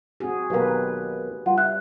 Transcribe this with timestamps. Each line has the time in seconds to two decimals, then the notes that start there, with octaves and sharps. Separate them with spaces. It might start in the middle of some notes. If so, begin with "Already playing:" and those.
0.20 C4 F#4 G#4
0.50 B1 D#3 A#3 G4 B4
1.46 G3 F4 F#5
1.58 E5 F#6